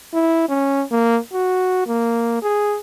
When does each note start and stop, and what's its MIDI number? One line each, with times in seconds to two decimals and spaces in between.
0.14 0.44 64
0.49 0.83 61
0.91 1.18 58
1.33 1.85 66
1.87 2.40 58
2.43 2.78 68